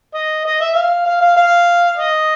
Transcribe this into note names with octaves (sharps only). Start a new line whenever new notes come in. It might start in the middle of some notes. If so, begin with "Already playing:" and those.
D#5
D#5
E5
F5
F5
F5
F5
D#5